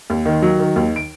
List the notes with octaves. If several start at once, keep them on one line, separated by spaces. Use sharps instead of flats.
D#2
D#3
F#3
D#3
D#2
D7